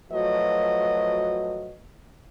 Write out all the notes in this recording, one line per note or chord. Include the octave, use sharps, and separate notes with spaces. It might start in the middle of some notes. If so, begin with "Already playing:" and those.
F3 F#3 A3 F#4 B4 D#5